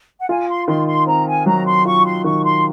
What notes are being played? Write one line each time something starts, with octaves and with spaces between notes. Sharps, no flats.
F#5
F4 G#5
C6
D#3 C6
C6
C4 A#5
G#5
F#3 A#5
C6
F4 C#6
C6
D#3 C#6
C6